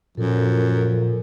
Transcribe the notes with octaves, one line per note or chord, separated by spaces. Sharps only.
F#2 A#2 F3 A4 A#4